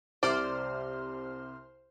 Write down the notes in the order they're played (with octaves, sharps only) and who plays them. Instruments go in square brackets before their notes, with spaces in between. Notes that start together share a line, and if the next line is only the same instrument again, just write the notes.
[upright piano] C2 C3 [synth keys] C5 C6 F6 [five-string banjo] D5